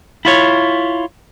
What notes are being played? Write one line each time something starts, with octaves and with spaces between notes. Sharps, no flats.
E4 F4 C#5